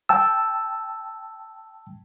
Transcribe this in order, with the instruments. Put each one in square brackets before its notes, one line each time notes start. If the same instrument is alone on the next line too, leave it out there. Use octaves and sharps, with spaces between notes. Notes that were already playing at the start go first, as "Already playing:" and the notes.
[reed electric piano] G5 A5 E6